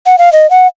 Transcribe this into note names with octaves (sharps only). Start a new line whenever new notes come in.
F#5
F5
D#5
F#5